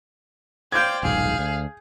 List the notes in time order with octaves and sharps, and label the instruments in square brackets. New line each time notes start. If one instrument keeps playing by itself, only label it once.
[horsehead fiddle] C5 F5 [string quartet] D5 G5 [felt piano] G6 G#6
[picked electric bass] D#1 B1 G#2 [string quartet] G#4 [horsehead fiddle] F5
[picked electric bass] D2